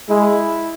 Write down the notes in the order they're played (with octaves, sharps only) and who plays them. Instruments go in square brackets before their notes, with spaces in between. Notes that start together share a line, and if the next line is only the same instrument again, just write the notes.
[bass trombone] G#3 [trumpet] E4